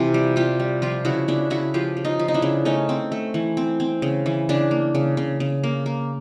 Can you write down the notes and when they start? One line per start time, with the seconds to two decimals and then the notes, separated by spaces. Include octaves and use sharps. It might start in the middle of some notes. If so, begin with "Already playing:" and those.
Already playing: C3 E3 F4 G4
0.14 G3
0.36 G3 F4 G4
0.60 G3
0.82 F3 F4 G4
1.05 C#3 E4 F#4
1.28 C#3 D4 E4
1.50 C#3 E4 F#4
1.74 F3 F4 G4
1.97 C#3
2.05 D#4 F4
2.19 F3
2.28 D#4
2.34 D4 E4
2.42 C#3
2.65 A3 C#4 D#4
2.89 C4
3.12 A3
3.34 E3
3.57 C4
3.80 C4
4.02 C#3
4.26 E3
4.49 C#3 D4
4.71 A#3
4.95 C#3
5.17 C#3
5.40 C#3
5.63 A#3
5.86 A#3